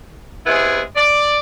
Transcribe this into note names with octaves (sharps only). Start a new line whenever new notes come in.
C3 G#3 B3 E4 G#4
D5